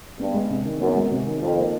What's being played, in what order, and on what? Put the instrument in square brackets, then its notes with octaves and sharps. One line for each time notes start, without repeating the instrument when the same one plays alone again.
[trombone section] G2 [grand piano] B3
[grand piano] G#3
C3
D#3
[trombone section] F#2 [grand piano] B3
[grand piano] G#3
C3
D#3
[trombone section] F2 [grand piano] D#4
[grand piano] A#3